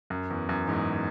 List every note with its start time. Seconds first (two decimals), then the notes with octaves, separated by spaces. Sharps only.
0.10 F#2
0.30 E2
0.49 F#2
0.67 E2 G#2